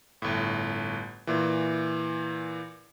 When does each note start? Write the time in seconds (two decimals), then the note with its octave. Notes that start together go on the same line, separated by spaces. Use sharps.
0.22 G1 A2
1.27 A#2 E3